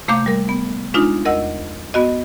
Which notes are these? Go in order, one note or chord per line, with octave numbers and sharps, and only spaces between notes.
C3 A3 A#3 F5 D6 G6
G3 A#4
B3
G#3 D4 D#4 F4
E2 A#4 D#5 F#5 E6
B3 F#4 D#5